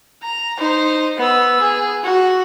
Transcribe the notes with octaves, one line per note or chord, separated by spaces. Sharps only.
A#5
D#4 C5
B3 E6
G#4
F#4